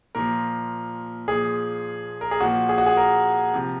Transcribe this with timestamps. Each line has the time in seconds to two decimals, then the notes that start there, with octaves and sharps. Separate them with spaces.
0.15 A#2 F3 A#4
1.28 A#2 F3 G#4
2.21 A#4
2.31 G#4
2.40 A#2 F3 F#4
2.69 G#4
2.78 F#4
2.86 G#4
2.97 A#4
3.54 C3 F3